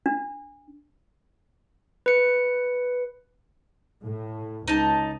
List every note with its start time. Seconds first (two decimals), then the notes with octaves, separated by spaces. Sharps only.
0.06 D4
2.06 B4 C#7
4.04 A2
4.68 C#2 D#4 A5